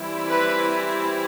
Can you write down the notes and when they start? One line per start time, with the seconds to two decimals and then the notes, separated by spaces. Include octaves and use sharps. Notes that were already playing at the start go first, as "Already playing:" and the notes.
Already playing: E3 G3 C4 E4
0.29 B4